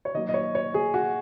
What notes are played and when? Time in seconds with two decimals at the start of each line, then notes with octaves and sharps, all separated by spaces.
0.05 C#5
0.14 D#3 F#3 A#3 D#5
0.29 D#5
0.34 C#5
0.55 C#5
0.74 G#4
0.94 F#4